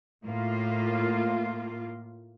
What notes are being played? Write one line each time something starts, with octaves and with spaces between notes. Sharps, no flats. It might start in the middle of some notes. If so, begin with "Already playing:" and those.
A2 A#3 F4